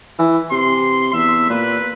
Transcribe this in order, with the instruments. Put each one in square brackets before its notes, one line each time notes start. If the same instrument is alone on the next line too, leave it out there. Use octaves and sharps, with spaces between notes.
[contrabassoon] E3
[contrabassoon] C3 [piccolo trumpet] C6
[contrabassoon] E2 [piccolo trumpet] E5
[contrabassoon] A#2 [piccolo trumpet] B4